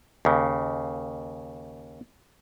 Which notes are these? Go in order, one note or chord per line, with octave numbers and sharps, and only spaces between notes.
D#2 C#3